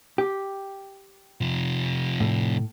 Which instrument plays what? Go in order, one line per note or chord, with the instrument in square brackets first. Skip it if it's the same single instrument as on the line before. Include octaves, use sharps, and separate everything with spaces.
[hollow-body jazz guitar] G4
[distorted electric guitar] C3 F3
[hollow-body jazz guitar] A2